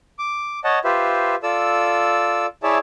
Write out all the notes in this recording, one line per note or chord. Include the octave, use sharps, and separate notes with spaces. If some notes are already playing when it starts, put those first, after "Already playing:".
D6
C#5 D#5 F#5 A5
F4 G4 B4 C5 E5
F4 A4 D5 E6
E4 G#4 C#5 D5 E5 A5